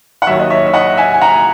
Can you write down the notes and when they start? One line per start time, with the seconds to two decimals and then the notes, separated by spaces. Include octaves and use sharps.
0.22 F#5
0.27 D#2 D#3 F#3 C#5 E5
0.40 D#5
0.50 C#5 E5
0.66 E5
0.74 D#5 F#5
0.97 E5 G#5
1.14 G#5
1.21 F#5 A#5